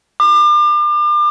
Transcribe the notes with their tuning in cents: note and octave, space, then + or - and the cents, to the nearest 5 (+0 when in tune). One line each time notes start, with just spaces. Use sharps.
D6 +35